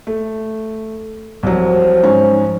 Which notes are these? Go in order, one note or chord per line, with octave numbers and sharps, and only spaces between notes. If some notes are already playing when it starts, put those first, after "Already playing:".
A3
C2 F3 F#3
G#2 C#4